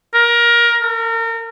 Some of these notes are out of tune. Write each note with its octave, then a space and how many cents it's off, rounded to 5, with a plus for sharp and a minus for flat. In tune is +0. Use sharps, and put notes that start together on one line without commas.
A#4 +20
A#4 -35